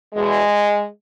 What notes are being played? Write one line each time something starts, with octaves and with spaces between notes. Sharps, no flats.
E2 B2 G#3